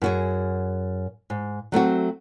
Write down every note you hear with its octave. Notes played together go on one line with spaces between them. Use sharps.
F#2 F#4 G#4
G#2
F#3 A3 C4 F#4